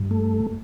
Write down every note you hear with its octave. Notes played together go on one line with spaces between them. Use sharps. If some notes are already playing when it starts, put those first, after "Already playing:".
Already playing: G2
A3